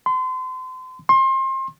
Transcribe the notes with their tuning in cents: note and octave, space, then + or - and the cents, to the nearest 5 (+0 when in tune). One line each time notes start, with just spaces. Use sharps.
C6 -35
C6 +30